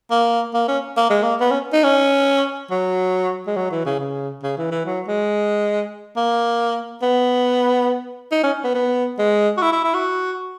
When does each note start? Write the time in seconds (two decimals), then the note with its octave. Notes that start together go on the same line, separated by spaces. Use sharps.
0.11 A#3
0.54 A#3
0.68 C#4
0.97 A#3
1.10 G#3
1.23 A#3
1.40 B3
1.51 C#4
1.73 D#4
1.84 C#4
2.71 F#3
3.47 G#3
3.57 F#3
3.71 E3
3.86 C#3
3.99 C#3
4.43 C#3
4.57 E3
4.71 E3
4.86 F#3
5.08 G#3
6.16 A#3
7.02 B3
8.32 D#4
8.43 C#4
8.64 B3
8.75 B3
9.19 G#3
9.57 F#4
9.62 E4
9.72 E4
9.84 E4
9.94 F#4